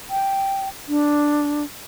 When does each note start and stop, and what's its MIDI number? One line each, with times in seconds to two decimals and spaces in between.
0.10 0.69 79
0.88 1.64 62